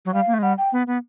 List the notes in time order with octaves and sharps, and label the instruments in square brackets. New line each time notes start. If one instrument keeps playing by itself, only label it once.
[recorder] F#3
[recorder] G3 [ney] F5
[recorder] A#3
A3
G#3
[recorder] G3 [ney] F#5
[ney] G5
[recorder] B3
B3